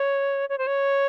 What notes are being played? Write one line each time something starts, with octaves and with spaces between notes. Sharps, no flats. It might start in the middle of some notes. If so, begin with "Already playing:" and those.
Already playing: C#5
C#5
C5
C#5